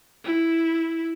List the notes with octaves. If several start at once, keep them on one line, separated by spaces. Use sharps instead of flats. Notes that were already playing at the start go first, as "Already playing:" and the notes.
E4